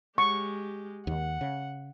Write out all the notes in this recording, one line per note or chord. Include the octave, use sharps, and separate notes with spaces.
G#3 G4 C#6
D#2 D#3 F#5
C#3